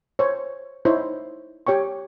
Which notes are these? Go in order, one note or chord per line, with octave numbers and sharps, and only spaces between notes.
C5 C#5
D#4 E4 C5 C#5
G4 C#5 G5 C#6